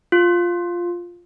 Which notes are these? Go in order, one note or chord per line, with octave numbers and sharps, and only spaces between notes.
F4